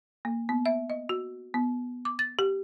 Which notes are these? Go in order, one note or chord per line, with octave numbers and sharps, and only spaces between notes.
A#3
B3
E5
D#5
F#4
B3
D6
A6
G4